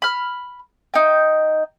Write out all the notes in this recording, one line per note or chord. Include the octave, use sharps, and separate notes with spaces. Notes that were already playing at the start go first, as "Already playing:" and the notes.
B5 F6
D#4 G5